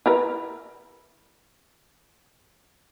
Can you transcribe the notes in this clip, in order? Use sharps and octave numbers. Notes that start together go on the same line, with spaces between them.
E4 A#4 B4